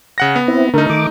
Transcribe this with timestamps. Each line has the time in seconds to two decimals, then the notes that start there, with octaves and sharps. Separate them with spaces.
0.18 C#3 F#5 A#6
0.36 B3
0.48 C4 E4
0.74 D3 A3 D#4 A#4
0.90 D#3 D6